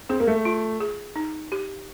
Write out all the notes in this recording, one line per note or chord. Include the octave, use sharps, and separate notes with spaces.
C4 G#4
A#3
A3
F4
G#4
D#4
G4